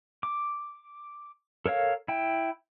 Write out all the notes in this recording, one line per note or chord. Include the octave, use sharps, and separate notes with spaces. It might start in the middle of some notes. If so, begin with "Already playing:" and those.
D6
A4 A#4 C#5 F5
E4 G5